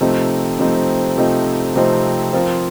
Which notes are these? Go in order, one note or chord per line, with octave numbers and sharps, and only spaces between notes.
C3 F3 A3 C4 D#4
C3 F3 A3 C4 D#4
C3 F3 A3 C4 D#4
C3 F3 A3 C4 D#4
F3 C4 F4 A#4